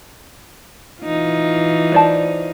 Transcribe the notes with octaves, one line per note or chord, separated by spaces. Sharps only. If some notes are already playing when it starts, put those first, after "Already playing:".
E3 D#4 F4
C5 D5 A5